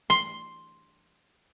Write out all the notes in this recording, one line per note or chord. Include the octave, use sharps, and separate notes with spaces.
C6